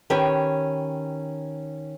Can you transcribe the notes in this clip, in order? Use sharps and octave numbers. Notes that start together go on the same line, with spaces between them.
D#3 C#4 G4 B4 C#5